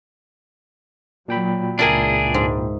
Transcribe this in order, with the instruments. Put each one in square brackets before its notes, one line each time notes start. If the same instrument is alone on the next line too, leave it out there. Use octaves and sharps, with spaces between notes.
[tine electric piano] A#2 G5 B5 [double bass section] F#3
[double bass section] C#2 [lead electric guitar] D4 G#4 [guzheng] E4 A#4 G#5
[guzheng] G#2